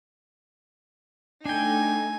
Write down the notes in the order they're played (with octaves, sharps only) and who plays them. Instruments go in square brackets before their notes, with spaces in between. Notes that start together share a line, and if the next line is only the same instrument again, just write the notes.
[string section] A3 D#4 [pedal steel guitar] D4 G5 [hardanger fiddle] G#5